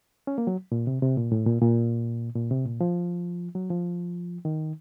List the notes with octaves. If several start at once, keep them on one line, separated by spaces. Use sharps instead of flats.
C#4
A#3
F#3
A#2
C3
C3
A#2
A2
A#2
A#2
A#2
C3
A#2
F3
F#3
F3
D#3